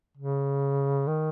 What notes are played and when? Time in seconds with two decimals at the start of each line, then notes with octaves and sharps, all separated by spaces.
0.17 C#3
1.07 D#3